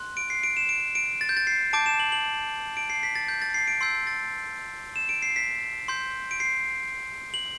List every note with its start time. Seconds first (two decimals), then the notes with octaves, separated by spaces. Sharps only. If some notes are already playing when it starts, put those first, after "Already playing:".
Already playing: C6 F#6
0.17 D7
0.30 C7
0.44 D7
0.57 E7
0.69 D7
0.95 D7
1.21 A6
1.29 G6
1.37 A6
1.47 C7
1.73 A5 D6 G6 D7
1.86 E7
1.99 F#7
2.12 F#7
2.77 D7
2.90 C7
3.03 B6
3.15 A6
3.28 G6
3.42 A6
3.54 C7
3.68 D7
3.81 C6 E6 G6 C7
4.07 A6
4.96 E7
5.09 D7
5.22 C7
5.36 B6
5.88 C6 G6
6.31 D7
6.40 C7
7.34 F#7